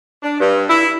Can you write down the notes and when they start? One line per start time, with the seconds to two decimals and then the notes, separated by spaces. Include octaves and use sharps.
0.22 D4
0.40 G2
0.69 E4